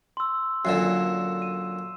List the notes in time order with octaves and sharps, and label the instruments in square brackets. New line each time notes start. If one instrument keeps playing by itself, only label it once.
[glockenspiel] C6 E6
[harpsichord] F#2 A#2 D3 [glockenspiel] C7 E7
[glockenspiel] D#7